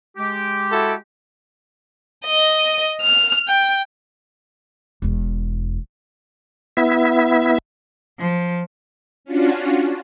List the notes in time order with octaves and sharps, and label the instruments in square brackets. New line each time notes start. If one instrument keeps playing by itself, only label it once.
[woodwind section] G#3 G4
[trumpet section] E4 F#4 A4
[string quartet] D#5
F6
G5
[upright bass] E1 E2
[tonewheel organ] B3 E4 E5
[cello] F3
[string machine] C#4 D4 F4 F#4